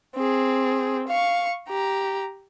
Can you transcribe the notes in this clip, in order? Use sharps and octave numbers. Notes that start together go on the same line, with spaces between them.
C4 G#4
F5 C#6
G4 A#5